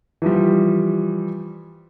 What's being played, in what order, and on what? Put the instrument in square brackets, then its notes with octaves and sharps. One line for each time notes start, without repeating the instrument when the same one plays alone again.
[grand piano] E3 F3 G3